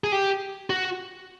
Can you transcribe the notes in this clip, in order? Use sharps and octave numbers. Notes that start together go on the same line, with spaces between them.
G#4
G4
F#4